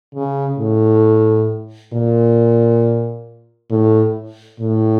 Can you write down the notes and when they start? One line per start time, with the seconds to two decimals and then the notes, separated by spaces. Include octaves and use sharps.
0.15 C#3
0.58 A2
1.93 A#2
3.70 A2
4.60 A2